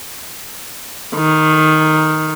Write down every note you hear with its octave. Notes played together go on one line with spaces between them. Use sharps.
D#3